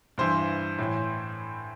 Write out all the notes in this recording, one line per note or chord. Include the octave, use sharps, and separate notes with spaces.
G2 E3 C5
A2 E3